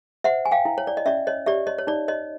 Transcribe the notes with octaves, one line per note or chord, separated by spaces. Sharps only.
C5 E5 F#5
G#5
F5 G5
E4
C#5
D5
D#5
C#4 D5 E5
C#5 D#5
G4 D5 E5
C#5 D#5
C#5
D#4 D5
C#5 D#5